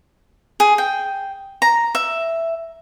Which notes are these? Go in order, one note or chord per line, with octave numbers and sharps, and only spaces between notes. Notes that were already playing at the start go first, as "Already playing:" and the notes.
G#4
G5
A#5
E5